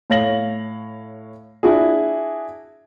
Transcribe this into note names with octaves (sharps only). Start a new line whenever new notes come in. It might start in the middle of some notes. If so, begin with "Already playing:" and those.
A2 C#5 F5 A#6 F#7
D4 E4 F#4 G#4